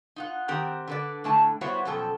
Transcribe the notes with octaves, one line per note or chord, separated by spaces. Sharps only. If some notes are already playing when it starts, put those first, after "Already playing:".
D#4 F4 F#5
D#3 C4 G4 A#4 F#5 A#5
D3 B4 D5
A2 D3 A3 G5 A5
G3 B3 E4 F#4 C5 C#5
F#2 B2 F3 A4 G5